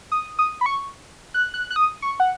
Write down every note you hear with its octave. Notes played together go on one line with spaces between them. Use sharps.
D#6
D#6
B5
C#6
F#6
F#6
F#6
D#6
C#6
F#5